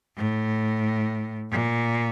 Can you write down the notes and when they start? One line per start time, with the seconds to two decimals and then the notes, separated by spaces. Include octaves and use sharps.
0.17 A2
1.51 A#2